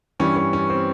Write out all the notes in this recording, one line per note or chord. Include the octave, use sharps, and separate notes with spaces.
G2 E3 G3 C#4
C#4
C#4
C4